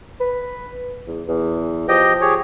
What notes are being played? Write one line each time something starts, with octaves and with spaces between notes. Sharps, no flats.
B4
E2
E2
F3 G4 D#5 G5
G4 G#4 C#5